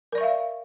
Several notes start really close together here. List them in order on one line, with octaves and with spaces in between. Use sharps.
A#4 D5 C#6 E5 F5